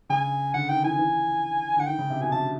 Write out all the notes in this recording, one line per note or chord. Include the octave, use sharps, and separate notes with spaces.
C#3 G#5
D3 F#5
D#3 G5
E3 G#5
E3
D3 F#5
D#3 G5
C#3
C3
B2 G#5
C3 A5